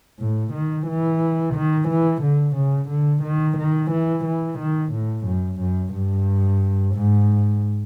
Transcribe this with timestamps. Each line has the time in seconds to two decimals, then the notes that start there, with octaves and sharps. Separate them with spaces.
0.19 A2
0.53 D#3
0.87 E3
1.55 D#3
1.89 E3
2.22 D3
2.56 C#3
2.90 D3
3.23 D#3
3.58 D#3
3.91 E3
4.25 E3
4.59 D#3
4.93 A2
5.26 F#2
5.60 F#2
5.94 G2
6.95 G#2